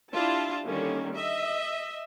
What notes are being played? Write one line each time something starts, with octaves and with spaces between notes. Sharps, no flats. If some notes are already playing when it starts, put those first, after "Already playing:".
D4 E4 F4 G4 A5
D3 D#3 G3 A#3 C#4
D#5 E5